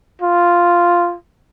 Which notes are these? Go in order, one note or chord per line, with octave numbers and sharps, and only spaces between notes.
F4